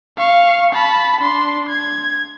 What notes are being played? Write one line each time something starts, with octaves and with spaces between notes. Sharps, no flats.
F5 C#6
A5 B5
D4 C6
G#6